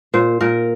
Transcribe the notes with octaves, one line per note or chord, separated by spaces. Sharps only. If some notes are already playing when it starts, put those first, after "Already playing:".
A#2 C5
A#2 A#4